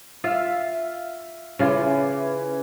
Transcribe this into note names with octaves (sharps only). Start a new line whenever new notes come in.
F4 E5 F5
C#3 E3 C#4 F4